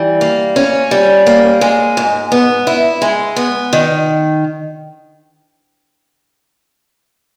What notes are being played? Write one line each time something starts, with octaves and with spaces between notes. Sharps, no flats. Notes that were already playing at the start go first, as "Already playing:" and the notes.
Already playing: E3 G3
A#3
C#4
G3
A#3
G#3
G#2
B3
E4
G#3
B3
D#3